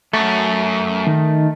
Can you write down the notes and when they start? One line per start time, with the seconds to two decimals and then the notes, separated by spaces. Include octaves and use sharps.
0.13 F#2 A3
1.07 D#3